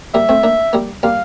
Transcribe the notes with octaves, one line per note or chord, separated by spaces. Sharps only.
G3 A#3 E5
A3 C4
A#3 D4
G3 A#3
G3 A#3 F5